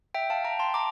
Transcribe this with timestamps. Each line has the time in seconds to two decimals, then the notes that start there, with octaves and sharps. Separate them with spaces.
0.14 E5 G5
0.30 F5 A5
0.45 G5 A#5
0.59 A5 C6
0.74 A#5 D6